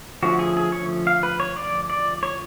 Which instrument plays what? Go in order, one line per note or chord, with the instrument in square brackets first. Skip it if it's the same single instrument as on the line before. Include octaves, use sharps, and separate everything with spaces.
[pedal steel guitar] D3 F3 A3 C#4 F#4
G#4
G#4
C#5
F5
B4
C#5
D5
D5
C#5